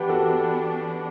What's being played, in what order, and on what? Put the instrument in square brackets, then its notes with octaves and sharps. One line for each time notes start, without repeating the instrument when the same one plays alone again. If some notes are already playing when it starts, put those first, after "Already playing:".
Already playing: [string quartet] E3 B3 D4 [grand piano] G4 B4 F#5 G5
[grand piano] F#4 A4